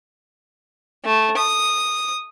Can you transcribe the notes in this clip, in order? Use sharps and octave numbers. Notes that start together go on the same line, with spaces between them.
A3
D#6